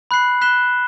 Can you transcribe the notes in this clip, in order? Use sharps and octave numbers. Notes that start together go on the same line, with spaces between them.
B5 F#6 C7 F#7
F#6 B6 E7 G7